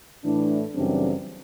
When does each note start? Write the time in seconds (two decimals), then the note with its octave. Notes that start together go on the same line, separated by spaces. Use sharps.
0.24 A2 E3 A3 D4
0.75 F#2 C#3 E3 G3 C4 D4